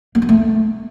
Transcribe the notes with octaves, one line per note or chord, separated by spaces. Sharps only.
A#3
B3
A3